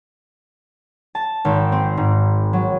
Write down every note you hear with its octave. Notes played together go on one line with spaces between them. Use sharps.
A5
G#1
C4
G#2
F#3